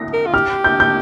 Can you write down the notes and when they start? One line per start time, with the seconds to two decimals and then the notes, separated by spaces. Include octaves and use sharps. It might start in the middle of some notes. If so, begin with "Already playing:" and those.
Already playing: A#6
0.13 A#4
0.26 F4
0.34 G4 F6
0.64 G6
0.80 G6